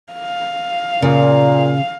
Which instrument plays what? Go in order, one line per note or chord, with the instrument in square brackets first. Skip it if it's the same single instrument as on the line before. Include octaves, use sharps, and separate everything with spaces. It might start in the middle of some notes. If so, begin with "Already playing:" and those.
[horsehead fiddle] F5
[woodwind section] A#2 [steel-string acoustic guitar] C#3